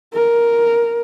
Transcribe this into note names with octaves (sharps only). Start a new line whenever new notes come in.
A#4